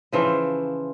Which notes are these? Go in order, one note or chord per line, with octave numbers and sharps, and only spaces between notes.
C#3 E3 F3